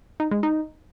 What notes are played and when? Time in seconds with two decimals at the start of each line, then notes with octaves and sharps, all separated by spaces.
0.20 D#4
0.31 G#3
0.43 D#4